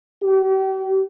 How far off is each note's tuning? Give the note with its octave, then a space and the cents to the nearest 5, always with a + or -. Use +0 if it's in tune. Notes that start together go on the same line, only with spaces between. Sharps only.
G4 -40